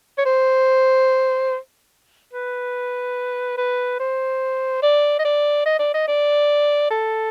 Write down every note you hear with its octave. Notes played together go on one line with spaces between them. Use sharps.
C#5
C5
B4
B4
C5
D5
D#5
D5
D#5
D5
D#5
D5
A4